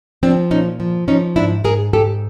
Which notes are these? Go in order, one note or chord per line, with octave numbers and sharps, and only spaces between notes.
F3 C4 D4
A#2 C#4 D#4
F3
F3 C#4 D#4
G#2 D4 E4
G#2 G#4 A#4
G#2 G4 A4